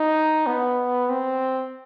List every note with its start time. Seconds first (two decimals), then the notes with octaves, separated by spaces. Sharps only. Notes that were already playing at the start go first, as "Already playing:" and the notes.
Already playing: D#4
0.46 B3
1.10 C4